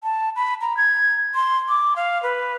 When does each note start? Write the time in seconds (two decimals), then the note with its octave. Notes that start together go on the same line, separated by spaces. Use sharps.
0.03 A5
0.36 B5
0.61 A#5
0.77 G#6
1.35 C6
1.68 D6
1.96 F5
2.23 B4